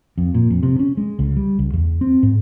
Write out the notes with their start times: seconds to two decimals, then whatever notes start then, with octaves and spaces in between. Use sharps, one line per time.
0.18 F2
0.34 A#2
0.50 F2
0.63 C3
0.79 C#4
0.97 G#3
1.19 C#2
1.36 G3
1.59 C#2
1.73 E2
2.01 C4
2.23 G#2